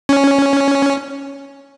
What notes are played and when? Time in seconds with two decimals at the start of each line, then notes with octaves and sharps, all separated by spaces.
0.09 C#4